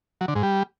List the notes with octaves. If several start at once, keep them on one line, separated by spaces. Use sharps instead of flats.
F#3
D3
G#2
G3